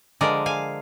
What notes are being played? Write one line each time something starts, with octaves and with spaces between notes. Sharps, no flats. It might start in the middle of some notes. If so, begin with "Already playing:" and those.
D3 F3 G#3 A#4 D5
F5 G#5